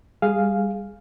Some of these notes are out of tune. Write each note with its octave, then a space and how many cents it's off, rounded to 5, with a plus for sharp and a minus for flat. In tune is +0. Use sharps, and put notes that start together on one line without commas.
G3 +25 G#4 +0 F5 +0